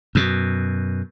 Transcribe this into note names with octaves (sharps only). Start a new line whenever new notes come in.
F#2 B2